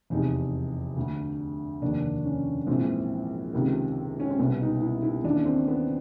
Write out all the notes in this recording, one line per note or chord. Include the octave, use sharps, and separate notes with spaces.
F1 E2 C3 D#4
D2 D3
F1 D#2 D3 D4
C#4
A#1 G#2 E3 C4
C#2 C3 D#3
C#4
C4
C2 B2 B3
D#4
E4
E4
D#2 C#3 E3 D4
C4
B3